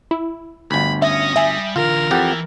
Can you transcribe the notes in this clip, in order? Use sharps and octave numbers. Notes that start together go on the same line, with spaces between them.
E4
G1 D2 B5
C#4 E5 D#6 A#6
G3 E5 G#5
D3 E3 F4 A#4
F2 E3 G4 F#5 A6